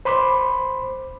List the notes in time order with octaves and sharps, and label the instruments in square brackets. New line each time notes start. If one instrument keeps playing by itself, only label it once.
[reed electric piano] C5 B5 C6 D6